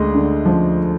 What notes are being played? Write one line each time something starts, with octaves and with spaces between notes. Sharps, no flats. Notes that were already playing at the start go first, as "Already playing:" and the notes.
Already playing: D2 G#3 D#5
D3
F3